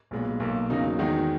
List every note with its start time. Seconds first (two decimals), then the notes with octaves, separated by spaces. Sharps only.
0.11 B1 A#2 G#3 B3
0.40 B1 B2 A#3
0.70 E2 C#3 F#3 A#3 D#4
0.99 E2 D#3 G#3 D#4 F#4